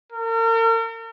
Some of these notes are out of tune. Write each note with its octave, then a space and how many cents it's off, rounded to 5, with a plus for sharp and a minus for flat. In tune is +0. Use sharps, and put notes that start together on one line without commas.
A#4 -40